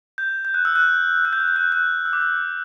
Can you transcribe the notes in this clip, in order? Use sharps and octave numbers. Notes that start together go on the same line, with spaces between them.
G6
G6
F#6
E6
F#6
F#6
G6
F#6
G6
F#6
G6
F#6
E6
D6
E6